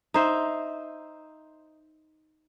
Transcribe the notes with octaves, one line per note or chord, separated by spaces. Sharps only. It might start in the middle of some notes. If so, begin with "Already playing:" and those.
D#4 C5 E5